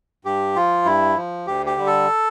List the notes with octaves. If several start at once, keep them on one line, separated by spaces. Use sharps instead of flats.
G2 G4
F3 F4
G2 E4
F3
D2 G4
G4
D3 G3
A4